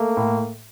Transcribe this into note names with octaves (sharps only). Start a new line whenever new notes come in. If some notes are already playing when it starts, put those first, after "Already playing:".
Already playing: A3 A#3
A2